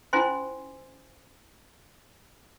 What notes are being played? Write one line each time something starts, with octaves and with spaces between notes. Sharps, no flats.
C#4 E4 F4 C5 G#5 C6